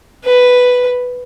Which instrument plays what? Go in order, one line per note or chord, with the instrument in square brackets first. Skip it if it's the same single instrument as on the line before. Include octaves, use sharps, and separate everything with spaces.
[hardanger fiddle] B4